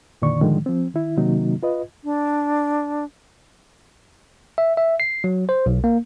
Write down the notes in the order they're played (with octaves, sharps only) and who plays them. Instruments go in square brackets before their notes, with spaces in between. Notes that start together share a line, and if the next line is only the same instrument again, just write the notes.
[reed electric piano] F2 A#2 D3 D#3 D5 C#6
A2 D3 D#3 F3 G#3
F3 C4
D#3 E4
C3 D#3 F#3 A#3 D#4 F#4
F4 B4 D#5
[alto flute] D4
[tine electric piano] E5
E5
C7
F#3
C5
B1
A#3